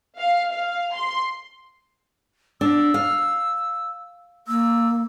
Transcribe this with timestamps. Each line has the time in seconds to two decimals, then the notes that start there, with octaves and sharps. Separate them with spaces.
0.19 F5
0.52 F5
0.95 C6
2.61 D4 E6
2.94 F5
4.48 A#3 E6